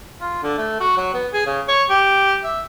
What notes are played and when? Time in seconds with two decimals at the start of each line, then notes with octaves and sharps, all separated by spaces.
0.21 F4
0.43 D3
0.58 A3
0.80 F#4
0.97 F#3
1.14 B3
1.34 G#4
1.46 C#3
1.68 C#5
1.90 G4
2.44 E5